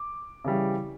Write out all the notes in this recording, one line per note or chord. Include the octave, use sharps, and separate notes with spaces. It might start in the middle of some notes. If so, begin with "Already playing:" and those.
Already playing: D6
C#3 E3 G3